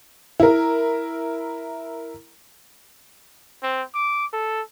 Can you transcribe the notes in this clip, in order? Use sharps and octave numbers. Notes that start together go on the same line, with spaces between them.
E4 A#4
C4
D6
A4